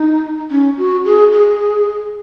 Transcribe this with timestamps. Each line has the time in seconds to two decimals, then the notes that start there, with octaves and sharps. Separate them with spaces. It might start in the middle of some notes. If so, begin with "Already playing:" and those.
Already playing: D#4
0.51 C#4
0.78 F#4
1.05 G#4
1.32 G#4